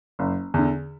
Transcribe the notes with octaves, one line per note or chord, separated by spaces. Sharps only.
F#1
E2 D3